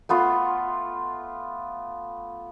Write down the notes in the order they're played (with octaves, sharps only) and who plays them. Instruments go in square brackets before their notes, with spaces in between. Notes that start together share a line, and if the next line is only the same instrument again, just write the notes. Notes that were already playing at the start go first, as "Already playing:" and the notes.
[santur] A3 B3 F4 C6